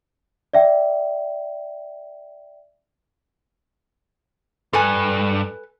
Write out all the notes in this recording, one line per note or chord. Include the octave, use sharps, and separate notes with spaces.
D5 E5 G5
G2 A4 B4 G#5